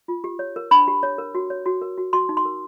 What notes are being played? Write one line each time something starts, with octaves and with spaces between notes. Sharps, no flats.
F4
G4
C#5
A#4
D4 B5
G4
C#5
A#4
F#4
C#5
F#4
A#4
F#4
F#4 C6
D#4
C6
A#4